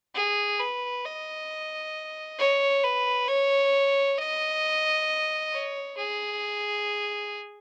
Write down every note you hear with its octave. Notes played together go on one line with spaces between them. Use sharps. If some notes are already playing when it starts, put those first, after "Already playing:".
G#4
B4
D#5
C#5
B4
C#5
D#5
C#5
G#4